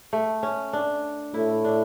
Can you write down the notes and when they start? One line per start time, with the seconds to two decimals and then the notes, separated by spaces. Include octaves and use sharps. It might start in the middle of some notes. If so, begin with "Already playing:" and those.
0.13 A3
0.43 C#4
0.73 D4
1.34 A2 E4
1.65 D4